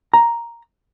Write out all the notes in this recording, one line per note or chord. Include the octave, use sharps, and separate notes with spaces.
A#5